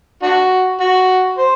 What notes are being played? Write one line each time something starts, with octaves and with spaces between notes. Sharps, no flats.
D4 F#4
F#4
C5